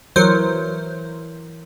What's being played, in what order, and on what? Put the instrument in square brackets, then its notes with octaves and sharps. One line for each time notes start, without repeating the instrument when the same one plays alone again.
[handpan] E3 A#4 C#5 [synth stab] F#3 C5